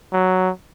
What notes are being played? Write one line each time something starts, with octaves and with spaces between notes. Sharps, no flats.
F#3